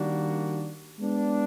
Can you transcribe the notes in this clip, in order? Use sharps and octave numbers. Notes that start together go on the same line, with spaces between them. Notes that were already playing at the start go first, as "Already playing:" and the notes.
Already playing: D#3 G3 A#3 D4 F#4
G#3 B3 D4